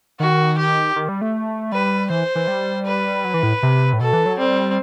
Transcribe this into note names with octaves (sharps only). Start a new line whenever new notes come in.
D#3 F#4
G4
D#3
G3
A3
G3 B4
E3 C5
E3
G3
B4
F#3
E3
A2
C3
A2
B2 A4
E3
F#3
G3 C4